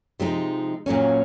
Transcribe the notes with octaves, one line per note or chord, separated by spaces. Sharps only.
C3 F3 G#3 B3 D#4
A#2 F#3 A#3 C#4